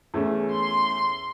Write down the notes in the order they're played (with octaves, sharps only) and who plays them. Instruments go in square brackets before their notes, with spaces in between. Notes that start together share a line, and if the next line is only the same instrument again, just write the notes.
[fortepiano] E2 A3 C#4
[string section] C6